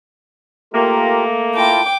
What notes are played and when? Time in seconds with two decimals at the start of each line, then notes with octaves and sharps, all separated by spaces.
0.74 A3 A#3 F4 G4 A#4
1.56 E4 F4 G5 A5 D6